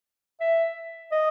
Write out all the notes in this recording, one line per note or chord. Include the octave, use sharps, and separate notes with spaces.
E5
D#5